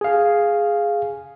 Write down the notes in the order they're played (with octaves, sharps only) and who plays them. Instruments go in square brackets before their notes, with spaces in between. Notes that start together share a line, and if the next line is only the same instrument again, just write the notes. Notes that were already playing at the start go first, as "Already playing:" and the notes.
[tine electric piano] G#4 F5